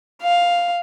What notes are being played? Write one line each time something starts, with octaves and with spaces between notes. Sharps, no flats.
F5